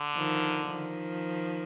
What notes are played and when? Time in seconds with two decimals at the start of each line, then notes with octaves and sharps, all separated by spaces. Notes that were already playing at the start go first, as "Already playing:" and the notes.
Already playing: D3
0.14 D#3 F3
0.66 D#3 F3